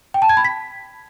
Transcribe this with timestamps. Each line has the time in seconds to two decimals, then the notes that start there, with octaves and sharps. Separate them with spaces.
0.14 G5
0.22 A5
0.29 G#6
0.37 B5
0.45 B6